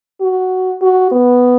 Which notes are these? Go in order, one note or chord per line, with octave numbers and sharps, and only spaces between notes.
F#4
F#4
B3